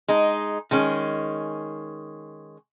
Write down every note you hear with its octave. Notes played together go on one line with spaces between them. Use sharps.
G#3 D#4
D#3 G#3 C#4